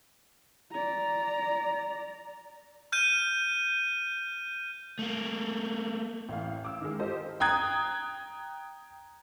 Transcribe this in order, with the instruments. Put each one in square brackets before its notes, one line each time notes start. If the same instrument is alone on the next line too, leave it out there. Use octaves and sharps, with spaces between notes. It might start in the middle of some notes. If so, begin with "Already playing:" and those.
[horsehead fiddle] D5 A#5
[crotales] F6 G6 D#7
[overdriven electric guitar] A3 A#3
[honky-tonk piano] A1 E3 F5
D6 E6
D#3 G#3
F4 G4 A4 C5 D#5
[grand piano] G5 A#5 D#6 F#6 G#6